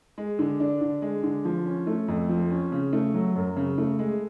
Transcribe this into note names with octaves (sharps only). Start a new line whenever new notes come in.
G#3
D3
D4
D3
G#3
D3
F3
C#4
A3
F2
F3
C#4
C#3
A3
F#3
F#2
C#3
A3
G#3